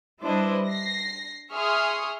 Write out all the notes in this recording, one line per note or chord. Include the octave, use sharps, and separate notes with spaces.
G3 D4 E4 B4 C5 D#5
A#6 C7
G#4 E5 C6 C#6 D#6 F6